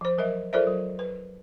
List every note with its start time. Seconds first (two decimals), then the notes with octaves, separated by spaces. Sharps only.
0.01 F3 C5
0.18 F#3 A#4 D#5 E5
0.53 F4 A4 A#4 C5 D5 E5
0.67 F#3
0.99 B4